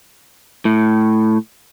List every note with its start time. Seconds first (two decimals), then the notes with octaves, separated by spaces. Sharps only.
0.65 A2